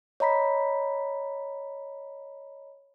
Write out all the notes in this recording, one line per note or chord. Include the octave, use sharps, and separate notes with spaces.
C#5 D#5 A#5 B5 B6